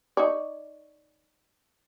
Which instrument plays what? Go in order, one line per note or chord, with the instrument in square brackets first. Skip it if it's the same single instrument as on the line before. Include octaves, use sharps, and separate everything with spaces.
[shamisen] D#4 C#5 D5